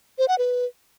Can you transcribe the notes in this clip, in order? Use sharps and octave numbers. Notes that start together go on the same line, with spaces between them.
C5
F#5
B4